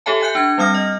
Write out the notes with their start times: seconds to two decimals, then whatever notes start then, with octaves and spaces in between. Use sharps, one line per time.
0.06 G4 A4 C#5 E5 G#5 A5
0.21 E5 G#5 F#6 G6 C#7
0.35 D4 G#6
0.58 G3 C4 D#6 F6 A#6
0.74 D#5